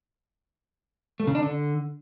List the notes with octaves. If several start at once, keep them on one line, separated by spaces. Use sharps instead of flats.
A3
C#3
D4
D3